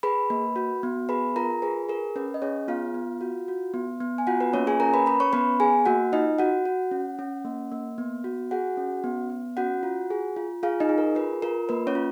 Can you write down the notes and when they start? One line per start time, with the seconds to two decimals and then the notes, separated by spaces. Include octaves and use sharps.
0.03 G#4 B4 B5
0.30 A#3
0.56 F#4
0.83 B3
1.09 G#4 B4 B5
1.36 F4 A#4 A#5
1.62 G#4 B4
1.88 G#4 A#4
2.16 C#4 B4
2.34 D#5
2.42 C#4 G#4 C#5
2.68 B3 F4 F5
2.94 B3
3.21 F#4
3.48 F#4
3.74 B3
4.01 B3
4.18 G#5
4.27 F4 F#4 F#5
4.40 B4
4.53 A#3 C#4 C#5
4.67 G#4 G#5
4.80 C#4 A#4 A#5
4.94 B4 B5
5.06 C#4 B4 B5
5.20 C#5 C#6
5.33 B3 B4 B5
5.60 G#4 G#5
5.86 A#3 F#4 F#5
6.12 D#4 F4 D#5
6.38 F#4 F#5
6.65 F#4
6.91 C#4
7.19 C#4
7.45 A#3
7.72 A#3
7.98 B3
8.24 F#4
8.51 F#4 G#4 F#5
8.77 C#4
9.04 B3
9.30 B3
9.57 C#4 F#4 F#5
9.83 F4
10.11 G#4
10.36 F4
10.63 F4 G#4 F5
10.80 D#4 D#5
10.89 G#4
10.98 A#4
11.15 F4 B4
11.42 F4 A#4
11.69 A#3 B4
11.87 C#4 C#5
11.95 F4